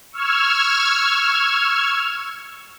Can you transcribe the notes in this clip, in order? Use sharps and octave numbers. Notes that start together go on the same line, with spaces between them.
C#6 E6 F6 G#6